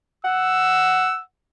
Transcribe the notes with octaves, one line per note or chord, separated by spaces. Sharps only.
F#5 E6